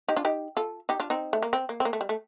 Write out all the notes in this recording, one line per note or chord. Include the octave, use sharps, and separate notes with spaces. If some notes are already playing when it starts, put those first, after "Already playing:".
D#4 G4
D4 F4
D#4 G4
F4 A4
D#4 G4
D4 F4
C4 D#4
A3
A#3
C4
A#3
C4
A#3
A3
G3
A3